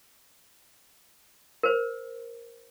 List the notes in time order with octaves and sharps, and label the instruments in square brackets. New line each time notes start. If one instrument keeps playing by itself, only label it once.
[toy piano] A#4 C5